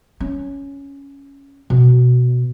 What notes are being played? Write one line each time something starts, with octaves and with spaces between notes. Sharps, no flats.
C#4
B2